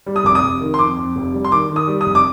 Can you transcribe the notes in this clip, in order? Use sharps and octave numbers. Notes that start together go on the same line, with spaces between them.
G3
D#6
F1 D6
D#6
F1
D#3
C6
F2 D6
F2
F1
G3
C6
D#3 D6
D#3
D#6
G3
D#6
F1
D6